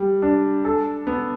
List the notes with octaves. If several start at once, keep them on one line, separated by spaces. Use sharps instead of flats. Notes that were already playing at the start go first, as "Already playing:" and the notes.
Already playing: G3
D4
A4
B3